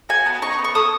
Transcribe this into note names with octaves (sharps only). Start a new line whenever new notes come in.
F#4 G#5
B3 A5
D#4 C#6
B3
C#6
A4 D#6